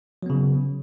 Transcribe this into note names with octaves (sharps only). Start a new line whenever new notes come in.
C#3 F#3 B3